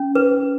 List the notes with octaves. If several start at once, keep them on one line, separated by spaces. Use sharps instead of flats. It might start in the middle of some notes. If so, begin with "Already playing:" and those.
Already playing: C#4
B4